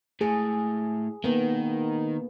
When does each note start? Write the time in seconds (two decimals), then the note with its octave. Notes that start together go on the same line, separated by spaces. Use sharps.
0.21 A2 G#4
1.24 D#3 A#3 B3